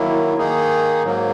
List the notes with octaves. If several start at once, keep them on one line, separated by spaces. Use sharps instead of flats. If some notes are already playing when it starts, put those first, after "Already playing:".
Already playing: D#3 F#3 A#3 E4
D#3 A#3 D#4 G#4
G#2 F#3 A#3